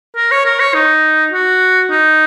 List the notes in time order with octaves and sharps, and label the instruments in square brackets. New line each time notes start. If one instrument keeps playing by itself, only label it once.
[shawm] A#4
C#5
A#4
C#5
D#4
F#4
D#4